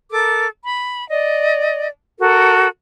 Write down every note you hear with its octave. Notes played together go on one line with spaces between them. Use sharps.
A4 A#4 D6
B5
D5 D#5
F#4 A4 A#4